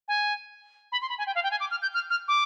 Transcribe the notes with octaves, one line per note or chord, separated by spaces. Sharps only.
G#5
B5
C6
B5
G#5
G5
F5
G5
G#5
D6
F6
G6
F6
F6
D6